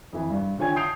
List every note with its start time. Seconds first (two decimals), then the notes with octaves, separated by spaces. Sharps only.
0.13 F2 E3
0.31 G2
0.58 D3 F4 C#5 G5 G#5 G#6
0.76 A5 D#6 G6 C7 D7 F7